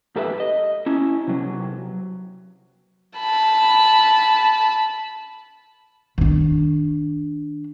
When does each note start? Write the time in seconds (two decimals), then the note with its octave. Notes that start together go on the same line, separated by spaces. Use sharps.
0.16 G#2 G4 A4 B4 E5
0.40 D#5
0.86 C#4 E4
1.27 C3 F#3
3.18 A5 B5
6.18 D#3 D4